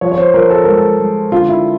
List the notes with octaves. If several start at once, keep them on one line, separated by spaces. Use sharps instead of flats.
F3 C#5
C#5
C5
F3 A#4
A4
G#3 A#4
A4
G#3
D3 F4
E4